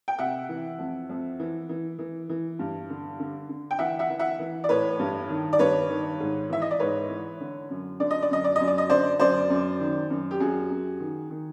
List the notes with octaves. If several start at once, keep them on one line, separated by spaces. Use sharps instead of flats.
G5
C3 E5 F#5
E3
F2
F2
E3
E3
E3
E3
G2
D3
D3
D3
G5
E3 E5 F#5
E5 F#5
E3
E5 F#5
E3
D5
A2 B4 C#5
G2
D#3
D5
G2 B4 C#5
D#3
G#2
E3 E5
D#5
D5
G#2 B4 C#5
E3
D3
F#2
D3 D5
D#5
D5
F#2 D#5
D5
F#2 D#5
D5
D#5
D3 C5 D5
F#2 C5 D5
F#2
D#3
F#2
G4
F#2 F#4 G#4
F#2
D#3
D#3